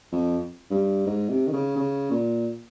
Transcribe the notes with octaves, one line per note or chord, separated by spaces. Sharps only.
F2
G2
G#2
C3
D#3
C#3
C#3
A#2